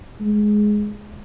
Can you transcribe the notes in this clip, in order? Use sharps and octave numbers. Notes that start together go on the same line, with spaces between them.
G#3